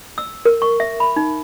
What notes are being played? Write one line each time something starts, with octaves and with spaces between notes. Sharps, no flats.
E6
A#4
C#6
E5
B5
D#4